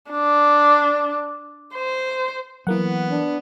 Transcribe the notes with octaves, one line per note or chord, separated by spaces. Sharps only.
D4
C5
E3 F#3 A#3 B3 F#5
D4